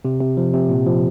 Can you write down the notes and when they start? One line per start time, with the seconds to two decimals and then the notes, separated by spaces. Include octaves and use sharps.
0.05 C3
0.21 C3
0.37 F3
0.53 C3
0.70 A#2
0.86 F3